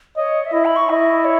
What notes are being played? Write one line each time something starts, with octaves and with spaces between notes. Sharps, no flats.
C#5 D#5
E5
E4 D#5
B5
C#6
E4 D#5
C#5